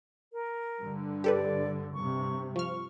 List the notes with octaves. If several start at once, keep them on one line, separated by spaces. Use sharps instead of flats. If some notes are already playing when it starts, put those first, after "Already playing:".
A#4
G2 D3
G4 A4 B4 D5
G2 C3 C#6
F3 C#6 F6